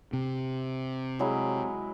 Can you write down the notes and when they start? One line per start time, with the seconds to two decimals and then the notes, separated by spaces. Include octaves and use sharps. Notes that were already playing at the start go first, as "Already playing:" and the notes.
0.13 C3
1.19 F#3 G#3 E4